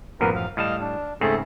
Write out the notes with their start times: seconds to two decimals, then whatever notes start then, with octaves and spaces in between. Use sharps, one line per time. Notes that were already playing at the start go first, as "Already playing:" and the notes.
0.21 A1 F#2 F3 A#3 B3 A#4
0.36 F5
0.57 A2 G3 D#5 F5 A5
0.81 D4
1.21 G#2 C#3 A3 C4 G#4 A4